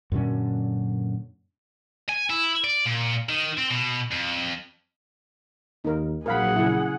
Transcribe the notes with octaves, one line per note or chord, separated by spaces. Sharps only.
F#2 A#2 D3 C#4
G#5
E4
D5
A#2
D#3
C4
B2
F2
D#2 D#4 A#4
A#1 F3 F#3 G#4 A#4 F5 F#5 B5
C#3 E4